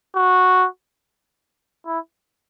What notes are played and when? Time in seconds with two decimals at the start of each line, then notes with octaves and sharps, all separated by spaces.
0.16 F#4
1.86 E4